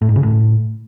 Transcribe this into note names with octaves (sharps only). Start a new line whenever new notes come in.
A2
G#2
C#3
A2